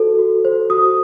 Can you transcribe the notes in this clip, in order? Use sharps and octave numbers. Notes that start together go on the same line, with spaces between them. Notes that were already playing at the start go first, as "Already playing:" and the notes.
Already playing: F#4 A4 C5
F#4
C5
F#4 D#6